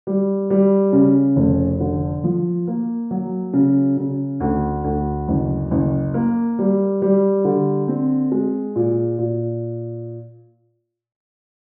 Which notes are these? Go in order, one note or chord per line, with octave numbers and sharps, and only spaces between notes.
G3
G3
C#3
F1
D3
F3
A#3
F#3
C#3
C#3
D2
D2
F#1
F#1
A#3
G3
G3
D3
C4
G#3
A#2
A#2